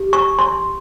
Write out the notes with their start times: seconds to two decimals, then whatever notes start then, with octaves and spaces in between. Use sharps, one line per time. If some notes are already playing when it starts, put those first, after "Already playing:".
Already playing: G4
0.13 C#6
0.39 C6